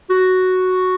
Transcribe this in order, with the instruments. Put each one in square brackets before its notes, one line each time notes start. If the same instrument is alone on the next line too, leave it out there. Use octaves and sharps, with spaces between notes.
[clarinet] F#4